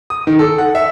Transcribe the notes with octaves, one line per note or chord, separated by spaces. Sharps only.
D#6
D#3
A4
F#5
E5